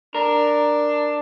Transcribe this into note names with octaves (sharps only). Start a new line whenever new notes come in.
D4 A#4